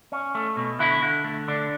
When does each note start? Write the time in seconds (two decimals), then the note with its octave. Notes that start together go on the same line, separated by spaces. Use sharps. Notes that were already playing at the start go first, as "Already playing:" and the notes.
0.12 C#4
0.35 A3
0.57 B2
0.79 D3 E4
1.02 D3
1.24 A3
1.48 D3 D4